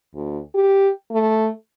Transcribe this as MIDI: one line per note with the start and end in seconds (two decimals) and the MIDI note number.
0.15 0.39 38
0.54 0.90 67
1.11 1.49 57